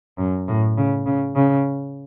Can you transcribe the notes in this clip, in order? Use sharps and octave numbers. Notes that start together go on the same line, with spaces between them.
F#2
A2
C#3
C#3
C#3